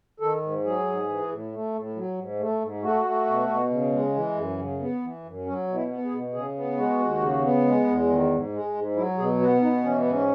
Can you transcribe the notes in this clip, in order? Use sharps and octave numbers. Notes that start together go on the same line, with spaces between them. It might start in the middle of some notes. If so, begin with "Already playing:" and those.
D#3 A4
G#2
F#3 G#4
G#2
E3
A2
A3
A2
F#3
G#2
A3
G#2
A3 F#4
A3
B2
B2
C#3
G#3
E3
F#2
C#3
B3
E3
F#2
F#3 C#4
B2
E4
B3
G#4
B2
C#3 G#4
B3
G#3 F#4
D#2
C#3
B3
G#3
E2
D#3
G#2
G#3
G#2
F#3 E4
B2 G#4
B3 F#4
B2 D#4
E3 C#4
B3
G#2
C#4